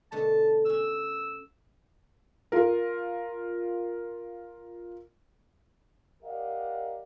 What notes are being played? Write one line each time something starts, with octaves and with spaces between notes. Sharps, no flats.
B2 D3 A3 A5
C#4 F#4 E6
F4 A#4
G4 A#4 D5 D#5 F5 F#5